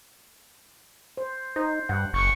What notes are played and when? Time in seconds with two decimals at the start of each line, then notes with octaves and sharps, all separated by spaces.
1.17 C5
1.56 D#4 C5
1.89 G2 F#5
2.13 F#1 C#6